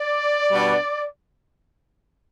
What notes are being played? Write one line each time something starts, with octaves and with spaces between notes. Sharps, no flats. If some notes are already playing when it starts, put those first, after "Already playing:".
Already playing: D5
B2 G3 B3 D4